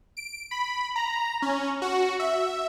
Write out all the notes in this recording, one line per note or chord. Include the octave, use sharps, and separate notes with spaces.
D7
B5
A#5
C#4
F#4
E5